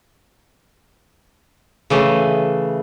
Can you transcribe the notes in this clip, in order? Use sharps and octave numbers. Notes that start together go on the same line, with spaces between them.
C#3 E3 A3